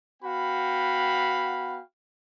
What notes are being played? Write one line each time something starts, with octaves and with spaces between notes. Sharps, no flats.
B3 F#4 F5 G5 B5